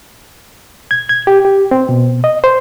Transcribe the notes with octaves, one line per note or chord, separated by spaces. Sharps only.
G#6
G#6
G4
G4
C4
B2
D#5
C5